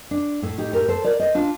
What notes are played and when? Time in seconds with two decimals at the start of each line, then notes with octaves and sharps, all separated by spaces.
0.11 D4
0.42 A2 A3
0.58 D#4 G4
0.73 G4 A#4
0.88 A4 C5
1.04 A#4 D5
1.19 C5 D#5
1.35 D4 F4